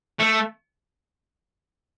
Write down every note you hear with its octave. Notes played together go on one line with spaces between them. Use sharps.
A3